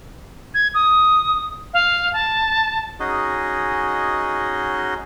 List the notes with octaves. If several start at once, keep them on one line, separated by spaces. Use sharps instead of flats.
G#6
D#6
F5
A5
C#4 D#4 F#4 G#4 D#5